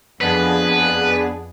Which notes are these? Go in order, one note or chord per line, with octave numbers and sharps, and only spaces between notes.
F2 B3 D4 G#4 B4